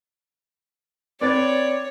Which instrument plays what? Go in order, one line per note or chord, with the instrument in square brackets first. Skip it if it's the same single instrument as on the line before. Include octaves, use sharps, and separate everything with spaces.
[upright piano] C4 B4 A6 [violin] C#5 [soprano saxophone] D5